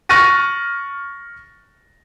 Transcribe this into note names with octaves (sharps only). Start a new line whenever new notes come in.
C#6 F6 F#6 A6 A#6 D#7